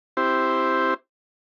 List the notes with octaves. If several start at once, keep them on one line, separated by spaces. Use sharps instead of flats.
C4 E4 G4 C5